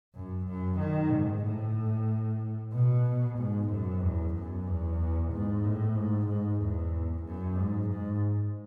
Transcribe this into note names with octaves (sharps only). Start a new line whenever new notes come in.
F#2
F#2
D#3
G#2
A2
B2
G#2
F#2
E2
F#2
E2
G#2
A2
G#2
G#2
E2
F#2
G#2
G#2